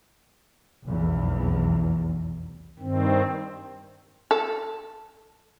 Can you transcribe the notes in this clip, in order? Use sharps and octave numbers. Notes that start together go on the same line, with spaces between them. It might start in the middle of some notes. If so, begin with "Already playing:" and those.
F1 B1 E2
G2 D#3 C4
A4